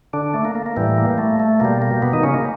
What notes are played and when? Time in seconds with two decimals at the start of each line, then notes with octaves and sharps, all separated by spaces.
0.13 D3 D4
0.34 A3
0.45 A#3
0.55 A#3
0.66 A#3
0.76 A2 E3 G3
0.98 A#3
1.18 A3
1.40 A3
1.60 B2 G3 A#3
1.82 A#3
2.02 B2 B3
2.13 D#3 D#4
2.23 C#3 C#4
2.34 A#3